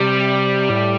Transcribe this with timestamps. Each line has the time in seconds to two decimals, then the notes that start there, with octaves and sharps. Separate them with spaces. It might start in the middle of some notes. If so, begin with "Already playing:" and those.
Already playing: C3 G3
0.69 A2